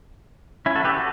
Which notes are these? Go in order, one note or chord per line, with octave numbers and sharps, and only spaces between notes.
C#4 E4
F#4 A4
G4 B4
F#4 A4